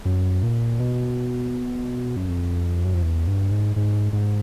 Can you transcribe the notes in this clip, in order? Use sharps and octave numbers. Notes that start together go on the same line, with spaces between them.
F#2
A#2
B2
F#2
F2
F#2
F2
E2
G2
G#2
G#2
G#2